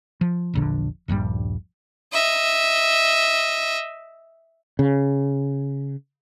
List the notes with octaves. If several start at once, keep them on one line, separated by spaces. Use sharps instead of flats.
F3
E1 A#1 D3
D#1 A#1 G2 G3
D#5 E5
C#3